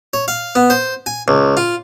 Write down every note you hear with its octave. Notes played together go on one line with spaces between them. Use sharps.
C#5
F5
B3
C5
G#5
C#2
F4